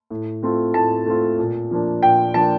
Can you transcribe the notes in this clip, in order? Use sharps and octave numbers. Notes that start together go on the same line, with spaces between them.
A2
A3 C4 F4
A2 A5
A3 C4 F4
A#2
F3 A#3 D4
A#2 G5
F3 A#3 D4 A5